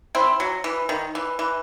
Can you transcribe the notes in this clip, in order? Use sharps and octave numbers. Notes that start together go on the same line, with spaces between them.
C4 E4
F#3
E3
D#3
E3
E3